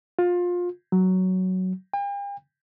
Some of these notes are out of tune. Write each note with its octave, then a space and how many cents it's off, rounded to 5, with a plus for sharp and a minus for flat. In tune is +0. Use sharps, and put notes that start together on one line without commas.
F4 +25
F#3 +5
G5 +45